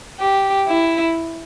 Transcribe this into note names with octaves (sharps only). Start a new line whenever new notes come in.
G4
E4